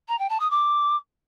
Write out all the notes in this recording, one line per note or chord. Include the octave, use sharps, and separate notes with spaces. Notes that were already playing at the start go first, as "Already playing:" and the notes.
A#5
G5
A5
D#6
D6